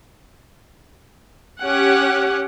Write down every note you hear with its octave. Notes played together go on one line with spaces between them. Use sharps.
C#4 G4 F#5